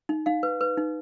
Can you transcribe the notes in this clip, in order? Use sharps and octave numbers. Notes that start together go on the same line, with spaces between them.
D#4
D#4 F5
B4
B4
D#4